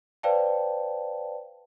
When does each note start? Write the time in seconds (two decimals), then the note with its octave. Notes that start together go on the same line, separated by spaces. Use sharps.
0.23 B4 C5 D5 F5 G5 A5